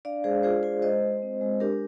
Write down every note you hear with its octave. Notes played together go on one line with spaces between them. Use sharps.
D4 D5 F5
G#3 G#4 C5
F4 G#4 C5
F4 G#4 C5
G#3 C5 D#5
G#3
C4
G#3
D4 G4 A#4